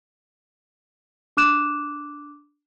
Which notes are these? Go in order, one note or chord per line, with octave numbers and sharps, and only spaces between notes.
D4 D6 F#6 E7